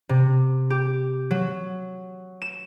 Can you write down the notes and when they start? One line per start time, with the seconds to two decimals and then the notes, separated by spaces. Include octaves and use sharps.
0.09 C3
0.70 G4
1.31 F#3
2.42 E7